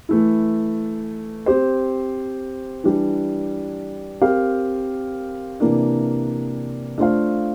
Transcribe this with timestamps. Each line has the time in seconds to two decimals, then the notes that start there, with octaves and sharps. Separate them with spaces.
0.09 E3 A3 E4
1.46 C4 G4 C5
2.84 E3 G3 D4
4.21 C4 G4 A#4 F5
5.60 C3 E3 A#3 D4
6.98 A3 D4 F4 C5 F5